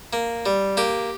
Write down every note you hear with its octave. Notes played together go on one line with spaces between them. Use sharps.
A#3
G3
A#3 G4